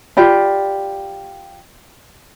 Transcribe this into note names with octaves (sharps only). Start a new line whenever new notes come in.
F4 G4 D5 B5